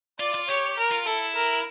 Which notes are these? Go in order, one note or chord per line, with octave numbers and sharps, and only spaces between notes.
F4 D5
F4
G4 C#5
A#4
F4
E4 A4
A#4